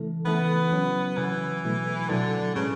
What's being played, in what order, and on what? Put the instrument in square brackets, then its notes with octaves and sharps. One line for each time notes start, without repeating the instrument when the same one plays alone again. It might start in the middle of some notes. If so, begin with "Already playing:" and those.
Already playing: [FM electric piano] C#3 E3 A3 E4 A4
[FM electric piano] C#3 E3 A3 E4 A4 [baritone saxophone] B3
[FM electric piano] C#3 F#3 C#4
[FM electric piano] C#3 F#3 C#4 [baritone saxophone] E3
[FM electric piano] B2 F#3 A3 E4
[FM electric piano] B2 F#3 A3 E4 [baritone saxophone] D3
[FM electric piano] A2 G#3 C#4 G#4 B4 [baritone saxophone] C#3